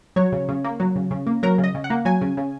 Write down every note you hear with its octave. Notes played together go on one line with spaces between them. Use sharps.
F#3 C#5
C#3
C#3
A#3
F#3
C#3
C#3
A#3
F#3 A#4
C#3
D#5
C#3
F#5
A#3
F#3 G#5
C#3
C#3